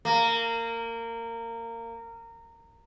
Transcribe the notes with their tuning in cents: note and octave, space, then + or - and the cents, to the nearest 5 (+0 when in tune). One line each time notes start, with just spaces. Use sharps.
A#3 -20